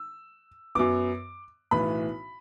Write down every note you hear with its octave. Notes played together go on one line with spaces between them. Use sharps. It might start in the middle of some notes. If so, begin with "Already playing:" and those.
Already playing: E6
F#2 F#3 B3 D6
B1 A2 E3 B3 B5